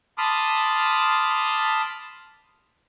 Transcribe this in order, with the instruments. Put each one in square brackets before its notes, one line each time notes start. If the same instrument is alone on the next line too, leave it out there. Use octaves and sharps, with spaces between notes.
[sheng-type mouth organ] A5 B5 C6 D6 D#6 F6